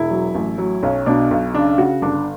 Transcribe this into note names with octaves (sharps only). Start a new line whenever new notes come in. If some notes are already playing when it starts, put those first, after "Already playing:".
Already playing: E1 E4
F#3
A1
F#3
B1 C#4
B2 D4
B1
C#3 D4
C#3 F#4
G1 D4